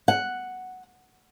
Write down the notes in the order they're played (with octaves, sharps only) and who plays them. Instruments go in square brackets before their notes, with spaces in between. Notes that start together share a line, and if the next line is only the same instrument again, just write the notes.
[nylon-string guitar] F#5